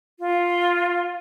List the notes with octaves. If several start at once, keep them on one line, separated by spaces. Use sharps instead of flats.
F4